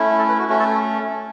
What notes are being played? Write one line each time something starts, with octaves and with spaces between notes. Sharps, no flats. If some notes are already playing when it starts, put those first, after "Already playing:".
Already playing: A3 C#4 E4
A4
B4
F#4
A3 C#4 F#4
A4